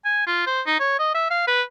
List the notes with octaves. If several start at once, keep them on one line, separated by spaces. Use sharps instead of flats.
G#5
F4
C5
D#4
C#5
D#5
E5
F5
B4